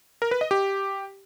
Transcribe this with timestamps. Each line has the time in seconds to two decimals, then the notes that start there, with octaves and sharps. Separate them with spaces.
0.22 A#4
0.31 B4
0.41 D#5
0.51 G4